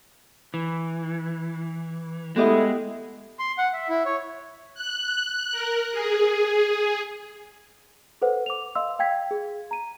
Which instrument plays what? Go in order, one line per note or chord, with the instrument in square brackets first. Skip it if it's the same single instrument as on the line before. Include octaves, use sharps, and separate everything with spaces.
[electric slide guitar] E3
[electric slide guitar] G#3 [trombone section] A3 E4 [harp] B3 G4 D#5
[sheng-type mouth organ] C6
F#5
E5
E4
C#5
[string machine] F#6
A#4
G#4
[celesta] A4 B4 C5 F#5
D6 F7
D#5 F5 C6 E6
F5 G5 G#6 B6
G#4
A#5 D#7